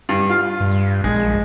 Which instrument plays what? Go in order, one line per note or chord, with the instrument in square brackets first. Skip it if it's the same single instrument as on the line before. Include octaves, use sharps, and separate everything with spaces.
[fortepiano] G2
F4 F5
[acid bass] G2
[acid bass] A#1 [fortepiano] G#3